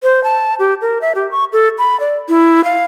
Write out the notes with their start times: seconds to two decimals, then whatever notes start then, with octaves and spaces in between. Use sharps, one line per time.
0.03 C5
0.24 A5
0.59 G4
0.81 A#4
1.01 E5
1.15 G4
1.31 C#6
1.53 A4
1.78 B5
2.00 D5
2.29 E4
2.64 F5